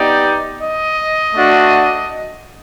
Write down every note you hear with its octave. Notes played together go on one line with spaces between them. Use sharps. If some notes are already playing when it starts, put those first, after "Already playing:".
Already playing: B3 D#4 G4 D5
D#5
A3 D4 F#4